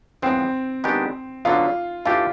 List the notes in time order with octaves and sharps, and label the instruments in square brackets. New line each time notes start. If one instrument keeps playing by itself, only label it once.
[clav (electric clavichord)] A2 F3 G#3 B3 [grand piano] C4
[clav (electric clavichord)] D#3 G#3 B3 D4 G4
[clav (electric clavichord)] D3 F#3 B3 [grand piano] F4
[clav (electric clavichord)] E3 A3 D4 G4 [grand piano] F4